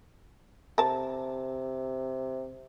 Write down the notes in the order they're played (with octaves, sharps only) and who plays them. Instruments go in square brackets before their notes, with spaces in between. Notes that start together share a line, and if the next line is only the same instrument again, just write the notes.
[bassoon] C3 [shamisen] A#4 A5